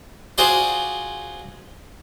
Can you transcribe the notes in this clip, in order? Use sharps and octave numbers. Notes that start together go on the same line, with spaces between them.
F4 F#4 G#4 C5 D5 C6